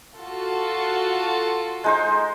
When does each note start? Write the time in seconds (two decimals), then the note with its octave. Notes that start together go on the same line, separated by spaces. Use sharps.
0.17 F4 F#4 A4
1.84 G#3 D#4 C5